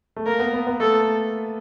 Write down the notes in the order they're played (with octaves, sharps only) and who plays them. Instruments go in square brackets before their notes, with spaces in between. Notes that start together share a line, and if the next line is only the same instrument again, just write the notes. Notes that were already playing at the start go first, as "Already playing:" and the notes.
[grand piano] A3
[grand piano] A#3 [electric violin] A#4
[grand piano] B3
B3
B3
[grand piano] A3 [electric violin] A4